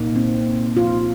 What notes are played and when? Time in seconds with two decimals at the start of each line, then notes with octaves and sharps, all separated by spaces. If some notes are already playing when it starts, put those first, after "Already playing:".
Already playing: C2 A#2 A#3 D#4
0.16 C4
0.77 F4